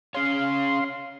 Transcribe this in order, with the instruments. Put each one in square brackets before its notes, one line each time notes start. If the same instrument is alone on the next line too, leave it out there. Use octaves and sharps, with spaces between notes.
[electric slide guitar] C#4 G#4 C#5 [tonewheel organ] F5 C6